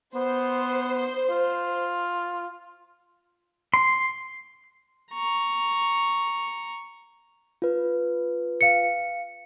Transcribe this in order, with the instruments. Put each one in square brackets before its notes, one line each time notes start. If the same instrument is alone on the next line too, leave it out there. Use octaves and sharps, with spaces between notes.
[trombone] B3 [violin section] C5
[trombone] F4
[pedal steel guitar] C6
[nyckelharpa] A#5 C#6
[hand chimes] F4 B4
[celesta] F5 C#7